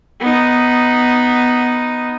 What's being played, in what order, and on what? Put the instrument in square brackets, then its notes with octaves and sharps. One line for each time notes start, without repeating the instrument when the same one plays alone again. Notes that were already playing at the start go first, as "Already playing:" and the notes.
[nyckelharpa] B3 D#4